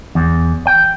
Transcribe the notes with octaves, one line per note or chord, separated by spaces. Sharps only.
E2
G5